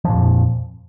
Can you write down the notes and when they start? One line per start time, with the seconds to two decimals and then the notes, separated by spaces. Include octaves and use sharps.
0.04 F3
0.09 A#2
0.14 F2